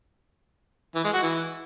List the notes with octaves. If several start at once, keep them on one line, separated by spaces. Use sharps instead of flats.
E3
G#3
F#4
E3